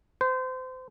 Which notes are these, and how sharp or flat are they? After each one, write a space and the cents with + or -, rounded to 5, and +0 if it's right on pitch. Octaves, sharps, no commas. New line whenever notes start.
C5 -30